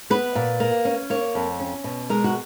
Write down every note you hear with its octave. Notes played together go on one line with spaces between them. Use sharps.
B3 B4
A#2
A#3
C#4
A#3 C#5
F2
C#4
B2
G#3 A#4
F#4